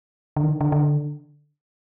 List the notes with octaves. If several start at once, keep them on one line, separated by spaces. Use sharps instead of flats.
D3
D#3
D3
D3
D3